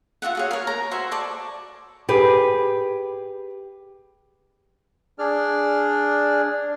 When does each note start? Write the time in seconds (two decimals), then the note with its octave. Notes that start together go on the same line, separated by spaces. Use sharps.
0.22 F4 F#4 E5 F#5
0.35 F#4 G#4 C#5
0.51 A#4 C#5
0.67 A#5
0.91 F#4 C5 E5 G#5
1.11 D5 A5 C#6
2.09 G4 G#4 B4
5.19 D4 G#4 D5 F6